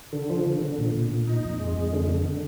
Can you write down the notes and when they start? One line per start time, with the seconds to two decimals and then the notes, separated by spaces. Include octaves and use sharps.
0.13 D3
0.30 F3
0.46 D3
0.62 D3
0.78 A#2
0.95 A#2
1.11 A#2
1.27 D#4
1.45 F2
1.60 G#3
1.76 F2
1.93 D3
2.09 D3
2.26 D3